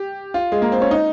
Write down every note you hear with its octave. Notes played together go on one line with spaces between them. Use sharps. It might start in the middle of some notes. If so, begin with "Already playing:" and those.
Already playing: G4
F4
G#3
A#3
C4
C#4
D#4